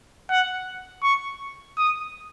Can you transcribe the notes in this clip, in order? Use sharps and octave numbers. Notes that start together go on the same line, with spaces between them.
F#5
C#6
D#6